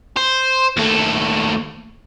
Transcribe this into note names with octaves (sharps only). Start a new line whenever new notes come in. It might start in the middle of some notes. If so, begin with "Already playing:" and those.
C5
D#2 A3